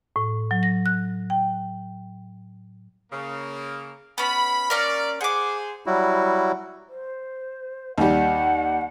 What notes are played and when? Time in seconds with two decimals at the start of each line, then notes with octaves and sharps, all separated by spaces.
0.16 A2
0.51 F#3
0.63 A#6
0.86 F#6
1.30 G5
3.12 C#3 A#3
4.18 B3 C#4 B5
4.70 A#3 C#4 A#4 D5
5.21 G#4 C5 F#5 D6
5.86 F#3 G3 E4 F#4
6.89 C5
7.98 D#2 G3 F#5